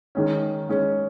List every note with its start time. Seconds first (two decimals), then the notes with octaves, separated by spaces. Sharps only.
0.15 D#3 G#3 C#4
0.69 D#3 G#3 C#4